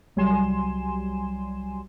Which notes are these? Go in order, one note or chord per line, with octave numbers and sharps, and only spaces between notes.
C2 F#3 G3 G#5 C6 E7